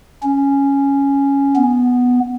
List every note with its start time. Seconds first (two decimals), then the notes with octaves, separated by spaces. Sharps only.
0.23 C#4
1.56 B3